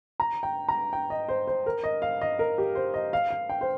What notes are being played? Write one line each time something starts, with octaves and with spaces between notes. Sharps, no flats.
A#5
G5
A#5
G5
D#5
C5
C5
A#4
D#5
F5
D#5
A#4
G4
C5
D#5
F5
F5
G5
C5